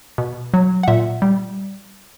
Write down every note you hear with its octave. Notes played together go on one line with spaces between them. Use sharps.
B2
F#3
F#5
A#2 E5
G3